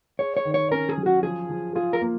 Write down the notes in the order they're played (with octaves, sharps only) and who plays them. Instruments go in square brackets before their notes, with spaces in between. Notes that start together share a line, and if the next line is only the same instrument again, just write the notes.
[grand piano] G#4 [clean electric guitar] C#5
[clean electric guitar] C#5
[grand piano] D#3
[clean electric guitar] C#5
[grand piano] C#4 [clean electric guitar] A#4
[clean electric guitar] G#4
[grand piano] F#3
[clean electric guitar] F#4
[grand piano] F3 [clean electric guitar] G#4
[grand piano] F3
[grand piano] F4 [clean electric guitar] G#4
[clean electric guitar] A#4
[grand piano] A#3